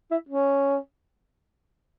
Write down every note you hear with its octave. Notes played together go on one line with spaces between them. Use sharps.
E4
C#4